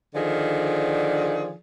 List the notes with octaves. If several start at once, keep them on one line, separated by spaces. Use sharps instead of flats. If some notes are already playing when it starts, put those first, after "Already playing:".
D3 D#3 F3 G#4 D5